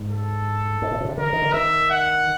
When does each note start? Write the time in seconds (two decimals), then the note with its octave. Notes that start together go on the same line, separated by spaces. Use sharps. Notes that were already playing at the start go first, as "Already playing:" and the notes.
Already playing: G#2
0.10 A4
0.82 G#2
0.91 A2
1.01 A#2
1.05 B2
1.09 C3
1.18 D3 A#4
1.33 D#3
1.42 D3
1.53 D#3 E5
1.90 F#5